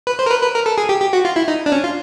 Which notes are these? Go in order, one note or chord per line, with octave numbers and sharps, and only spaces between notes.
B4
C5
A#4
B4
B4
A#4
A4
G#4
G4
G4
F#4
F4
E4
D#4
D4
C#4
F4